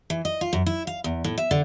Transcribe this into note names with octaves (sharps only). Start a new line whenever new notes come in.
E3
D#5
F4
F#2
E4
F5
E2
A2
E5
D3